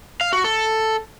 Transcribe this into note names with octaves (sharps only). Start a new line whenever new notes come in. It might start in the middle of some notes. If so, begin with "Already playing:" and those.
F5
F#4
A4